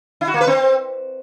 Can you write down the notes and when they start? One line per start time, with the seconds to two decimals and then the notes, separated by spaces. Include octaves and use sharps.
0.21 E4
0.28 F#4
0.34 A#3
0.41 B4
0.47 C4